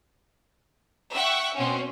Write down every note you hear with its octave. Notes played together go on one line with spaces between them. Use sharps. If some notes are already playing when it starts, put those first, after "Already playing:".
E5 F#5 G5 C#6 F#6
B2 C4 C#4